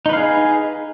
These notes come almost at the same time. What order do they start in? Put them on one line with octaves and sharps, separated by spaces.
D#4 B4 F5 G#4